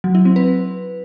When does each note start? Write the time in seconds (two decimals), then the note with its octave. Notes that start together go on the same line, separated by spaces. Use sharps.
0.04 F#3
0.15 E4
0.25 C4
0.36 B4